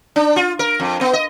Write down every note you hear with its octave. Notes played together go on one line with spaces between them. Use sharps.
D4
F4
A#4
F2
B3
D#5